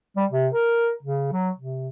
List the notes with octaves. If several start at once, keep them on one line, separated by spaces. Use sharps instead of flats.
G3
C3
A#4
C#3
F#3
C3